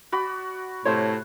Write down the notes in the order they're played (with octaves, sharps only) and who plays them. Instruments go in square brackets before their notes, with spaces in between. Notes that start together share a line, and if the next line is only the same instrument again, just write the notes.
[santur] F#4 D5 B5
[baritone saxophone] A2 [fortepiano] C3 C5 C#5